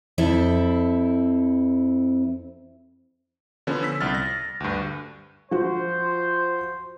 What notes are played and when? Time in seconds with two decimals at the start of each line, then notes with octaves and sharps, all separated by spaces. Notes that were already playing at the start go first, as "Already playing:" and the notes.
0.18 F2 C4 E4 A4
3.67 D3 F3 B3 C#4
3.83 E6 B6
4.00 C2 F6 A6
4.15 A#6
4.60 D2 G2
5.51 F3 F#4 C5